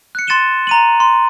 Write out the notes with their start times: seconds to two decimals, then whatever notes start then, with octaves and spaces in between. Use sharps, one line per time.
0.15 F#6 C#7
0.27 C6 A6 C#7 D#7 E7 G7
0.67 A#5 D#7 F#7
1.00 C6